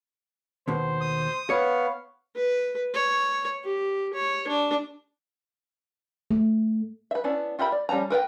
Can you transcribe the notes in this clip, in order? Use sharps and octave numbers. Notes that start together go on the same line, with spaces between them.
D#2 B2 C5
D#6
B3 C#5 F5
B4
C#5
G4
C#5
D4
A3
B4 E5
B3 C#4 D4 E4
F4 G4 A#4 E5 B5
D5
F3 G3 C#4 A5 A#5
A#4 B4 D#5 G5